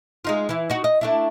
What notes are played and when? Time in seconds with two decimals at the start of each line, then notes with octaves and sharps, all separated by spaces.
0.25 G#3 D#4 F4
0.49 E3 E4
0.70 D#4 F#4
0.84 D#5
1.01 A3 D4 E4